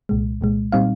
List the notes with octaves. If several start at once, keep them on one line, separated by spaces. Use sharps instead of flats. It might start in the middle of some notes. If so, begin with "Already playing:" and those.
C2 A#2 G#3
C2 A#2 G#3
A#2 G3 C4 D#4 F5